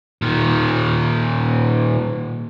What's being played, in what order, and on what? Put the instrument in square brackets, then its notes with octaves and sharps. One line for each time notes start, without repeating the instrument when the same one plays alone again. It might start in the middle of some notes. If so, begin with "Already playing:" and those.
[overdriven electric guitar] A#2 D#3